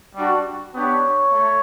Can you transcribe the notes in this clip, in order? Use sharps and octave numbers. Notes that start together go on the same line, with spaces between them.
G3 D4 F#4
B3 D4 G4 C#5
A3